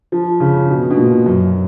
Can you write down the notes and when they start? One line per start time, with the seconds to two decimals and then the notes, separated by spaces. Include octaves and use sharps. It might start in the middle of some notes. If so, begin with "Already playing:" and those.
0.12 F3
0.40 C#3
0.70 B2
0.91 B2
0.97 A#2
1.26 F#2